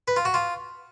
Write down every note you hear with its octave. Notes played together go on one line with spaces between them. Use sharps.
B4
F4
F#4
F4